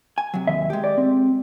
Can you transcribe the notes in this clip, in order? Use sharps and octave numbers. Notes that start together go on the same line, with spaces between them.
G#5
C3 F#3
D#2 D#5 E5
G#3 G4
D5
C4